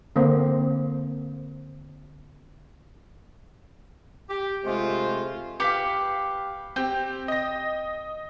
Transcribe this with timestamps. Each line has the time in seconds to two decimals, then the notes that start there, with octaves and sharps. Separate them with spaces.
0.16 D3 A#3 C4 C5
4.30 G4
4.64 C3 G#3 A3 F4 C5
5.60 G4 B4 F5 D6 B6 C#7
6.76 C4 G4 G5
7.28 D#5 A#6